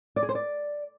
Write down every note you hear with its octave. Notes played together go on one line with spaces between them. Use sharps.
D5
G#4
C5
D5